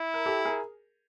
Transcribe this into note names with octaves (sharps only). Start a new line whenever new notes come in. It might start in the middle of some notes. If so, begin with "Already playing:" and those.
Already playing: E4
A#4
G4 A4
G#4 A#4